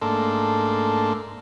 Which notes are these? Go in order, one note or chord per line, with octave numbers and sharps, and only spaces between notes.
G#2 A3 A#3 D4 A4 C6